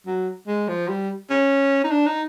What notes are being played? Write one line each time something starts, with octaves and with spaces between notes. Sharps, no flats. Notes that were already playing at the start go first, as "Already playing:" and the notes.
F#3
G#3
F3
G3
C#4
D#4
D4
D#4